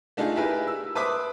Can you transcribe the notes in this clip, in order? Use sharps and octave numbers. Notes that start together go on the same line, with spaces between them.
A3 D4 D#4 F4 G#4
E4 G4 G#4 A#4 B4
E6
B4 C5 E5 D6 D#6